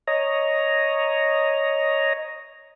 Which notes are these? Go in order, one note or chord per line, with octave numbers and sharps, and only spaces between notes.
C#5 D#5 A#5